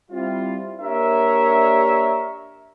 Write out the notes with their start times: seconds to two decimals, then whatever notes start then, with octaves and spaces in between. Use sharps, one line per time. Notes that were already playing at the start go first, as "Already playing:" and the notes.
0.11 G3 C4 E4 F4
0.80 A#3 D4 G4 A#4 C#5 E5